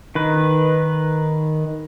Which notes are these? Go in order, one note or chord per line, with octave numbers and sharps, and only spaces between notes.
D#3 B4